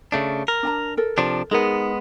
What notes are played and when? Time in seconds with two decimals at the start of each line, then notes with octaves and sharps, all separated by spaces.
0.12 C#3 A3 D4
0.48 A#4
0.63 D4 A5 A#5
0.97 A4 A#4
1.18 C3 F3 D4
1.51 G#3 B3 D#4 G#4 A#4